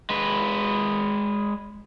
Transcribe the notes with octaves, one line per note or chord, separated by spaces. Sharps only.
G#3 B4